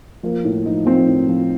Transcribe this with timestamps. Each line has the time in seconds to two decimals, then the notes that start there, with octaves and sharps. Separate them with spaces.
0.23 F3 A#3
0.44 A2
0.66 F3 D#4
0.86 F3 C4
1.07 A2
1.29 F3